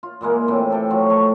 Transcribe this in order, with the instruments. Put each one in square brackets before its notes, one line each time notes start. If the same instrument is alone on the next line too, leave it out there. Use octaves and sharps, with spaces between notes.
[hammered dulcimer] F4
A#2 E3 G#3 A#3
A2 C3 E3
G4 A4 G5
F3 F#3 A3
A3 G5 C#6